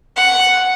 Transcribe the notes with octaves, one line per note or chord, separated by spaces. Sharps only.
F#5